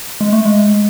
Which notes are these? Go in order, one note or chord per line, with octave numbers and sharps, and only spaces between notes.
G#3
A3
G#3